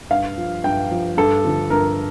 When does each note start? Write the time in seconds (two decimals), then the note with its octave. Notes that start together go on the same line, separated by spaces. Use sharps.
0.10 G2 F5
0.38 F3
0.64 G2 G5
0.91 F3
1.17 G2 A4
1.45 D3 F3
1.70 G2 A#4